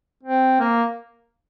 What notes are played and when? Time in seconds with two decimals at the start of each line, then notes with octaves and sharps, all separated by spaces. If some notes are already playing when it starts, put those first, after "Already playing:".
0.23 C4
0.60 A#3